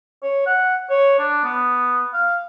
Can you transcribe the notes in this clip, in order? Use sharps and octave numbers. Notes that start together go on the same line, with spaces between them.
C#5
F#5
C#5
D4
B3
F5